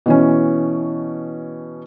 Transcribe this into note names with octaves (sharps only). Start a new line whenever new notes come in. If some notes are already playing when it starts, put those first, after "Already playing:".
B2 E3 C#4